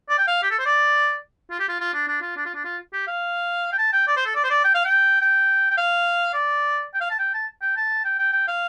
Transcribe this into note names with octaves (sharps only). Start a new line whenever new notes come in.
D5
G5
F5
G4
A4
C5
D5
F4
G4
F4
F4
D4
D4
F4
D4
F4
D4
F4
G4
F5
G5
A5
G5
D5
C5
A4
D5
C5
D5
G5
F5
G5
G5
G5
F5
D5
G5
F5
A5
G5
A5
G5
A5
G5
G5
G5
F5